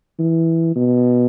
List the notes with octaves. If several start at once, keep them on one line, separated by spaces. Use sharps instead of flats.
E3
B2